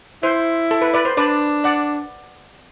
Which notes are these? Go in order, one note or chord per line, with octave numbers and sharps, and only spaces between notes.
E4 C5
A4
B4
B4 D5
C5
D4 B4 D5
D5 F#5